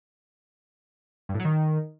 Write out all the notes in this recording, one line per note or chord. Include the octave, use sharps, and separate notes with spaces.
G2
A2
F#3
D#3